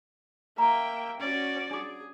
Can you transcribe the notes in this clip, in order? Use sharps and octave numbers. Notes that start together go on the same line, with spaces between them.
A#3 E5 G5 A#5
C#4 F#4 D5
D4 G#4 D6